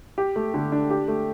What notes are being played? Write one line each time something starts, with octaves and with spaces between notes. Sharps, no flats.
G4
A3
D3
D4
G4
A3